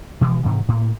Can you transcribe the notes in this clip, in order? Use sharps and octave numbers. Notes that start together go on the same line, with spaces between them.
B2 E3 F3 G#3
G#2 C3 D#3 E3
A2 A#3